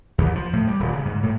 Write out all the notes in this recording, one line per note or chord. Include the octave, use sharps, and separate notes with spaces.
D#2
F3
A2
G3
D#1
C#3
G#2
A2